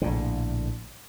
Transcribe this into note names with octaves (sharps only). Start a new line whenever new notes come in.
A#1 A2 D3